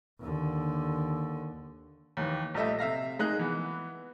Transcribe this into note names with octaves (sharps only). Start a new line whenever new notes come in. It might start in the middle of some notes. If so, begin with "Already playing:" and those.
D#2 D3
D#2 D#3 E3
A#1 G3 A3 D#5 E5
C3 E5 F5 A#6
G#3 A#3 D#4 G#4 D#5 F#6
E3 B3